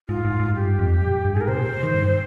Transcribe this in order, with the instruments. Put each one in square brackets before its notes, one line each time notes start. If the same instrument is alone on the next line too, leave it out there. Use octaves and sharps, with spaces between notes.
[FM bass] G#2 [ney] F4
[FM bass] G#2
G#2
[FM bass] G2 [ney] G4
[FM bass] F2
G2
A#2
G#2
G2
[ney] G#4
[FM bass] G#2 [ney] A#4
[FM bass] C3 [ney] C5
[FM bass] A#2
D#3
G2